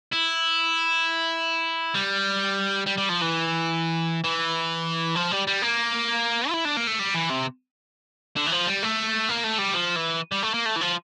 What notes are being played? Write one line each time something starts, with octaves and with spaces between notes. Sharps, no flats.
E4
G3
G3
G3
F3
E3
E3
F3
G3
G3
A#3
F4
E4
D4
A#3
A3
G3
E3
C3
D3
E3
F3
G3
A3
A#3
A3
G3
F3
E3
G3
A3
A#3
A3
E3
F3